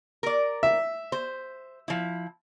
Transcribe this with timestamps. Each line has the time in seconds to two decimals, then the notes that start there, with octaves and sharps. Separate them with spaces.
0.23 A#4 D5
0.63 E5
1.12 C5
1.88 F3 E4